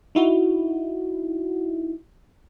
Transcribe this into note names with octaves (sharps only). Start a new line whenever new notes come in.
D#4 E4 F#4